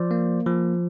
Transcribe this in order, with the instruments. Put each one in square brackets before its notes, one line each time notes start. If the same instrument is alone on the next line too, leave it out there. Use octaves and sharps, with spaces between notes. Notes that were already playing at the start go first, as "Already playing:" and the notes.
Already playing: [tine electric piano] F3 C5 D5
A#3
F3